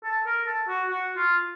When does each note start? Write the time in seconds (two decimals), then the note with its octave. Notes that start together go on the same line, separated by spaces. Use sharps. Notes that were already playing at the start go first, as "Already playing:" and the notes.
0.04 A4
0.26 A#4
0.46 A4
0.68 F#4
0.89 F#4
1.16 F4